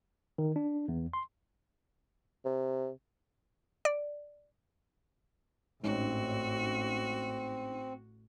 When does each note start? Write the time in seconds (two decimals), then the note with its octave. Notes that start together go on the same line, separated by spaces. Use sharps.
0.38 D#3
0.56 D4
0.88 E2
1.13 C6
2.45 C3
3.85 D5
5.83 A1 G#2 C4 C#4 D#4 F#4